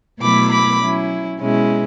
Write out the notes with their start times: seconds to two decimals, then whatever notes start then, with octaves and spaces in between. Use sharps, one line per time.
0.21 B2 F#3 A3 E4 B5 D6
0.51 B5 D6
0.80 F#3 C#4 E4
1.40 B2 G#3 C#4 E4